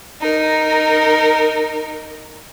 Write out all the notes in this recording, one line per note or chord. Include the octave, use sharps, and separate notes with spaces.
D#4 A#4